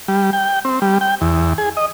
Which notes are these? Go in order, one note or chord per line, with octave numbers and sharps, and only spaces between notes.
G3
G5
C4
G3
G5
E2
G#4
D#5